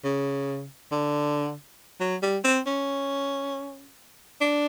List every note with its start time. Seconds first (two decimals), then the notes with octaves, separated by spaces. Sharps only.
0.04 C#3
0.92 D3
2.00 F#3
2.22 G3
2.44 C4
2.66 C#4
4.41 D4